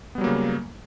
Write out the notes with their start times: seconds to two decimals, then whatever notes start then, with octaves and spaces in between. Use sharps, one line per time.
0.15 B3
0.18 G3
0.21 F#3
0.24 A#3
0.27 C#3